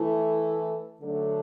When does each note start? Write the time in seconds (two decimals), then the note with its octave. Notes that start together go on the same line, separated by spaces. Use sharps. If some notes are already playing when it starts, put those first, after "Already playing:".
Already playing: E3 A3 E4 A4
1.02 D3 F#3 A3 D4 A4